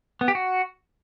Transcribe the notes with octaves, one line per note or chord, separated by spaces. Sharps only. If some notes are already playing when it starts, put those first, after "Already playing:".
B3
G4
F#4